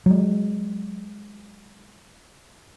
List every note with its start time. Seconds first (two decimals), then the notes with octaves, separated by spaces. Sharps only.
0.06 F#3 G#3